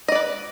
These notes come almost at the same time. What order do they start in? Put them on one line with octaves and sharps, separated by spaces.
D#5 D5 B4